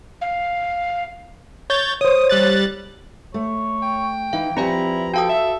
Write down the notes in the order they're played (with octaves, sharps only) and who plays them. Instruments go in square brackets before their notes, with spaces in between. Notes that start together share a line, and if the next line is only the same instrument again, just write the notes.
[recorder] F5
[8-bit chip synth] C#5 G6 A6
[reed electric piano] C5 C#5 [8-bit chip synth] D#6
[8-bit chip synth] G3 F#6 A6
[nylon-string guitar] A3 [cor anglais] C#5
[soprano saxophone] G5
[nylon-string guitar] E3 D#4 [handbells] F5
[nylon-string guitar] F3 G4 B4 [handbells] C4 D5 G#5 [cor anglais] E4 [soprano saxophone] A#5
[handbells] F#4 F5 D#6 [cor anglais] A4 [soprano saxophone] G5
[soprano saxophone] E5